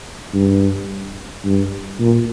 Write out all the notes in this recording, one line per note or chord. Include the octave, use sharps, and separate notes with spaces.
G2
G2
A#2